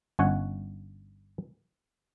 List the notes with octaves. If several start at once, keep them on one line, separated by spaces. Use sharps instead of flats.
G1 C#4 C#5 F#5 G#5